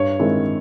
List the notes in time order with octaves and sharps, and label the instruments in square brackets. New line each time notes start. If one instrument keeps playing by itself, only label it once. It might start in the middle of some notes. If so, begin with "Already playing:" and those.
Already playing: [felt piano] G2 C#5
D#3 G#3 C4 E4